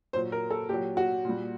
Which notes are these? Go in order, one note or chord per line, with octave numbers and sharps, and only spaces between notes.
A#2 F#3 C5
A#4
A4
A#2 F#3 G4
F#4
A#2 G3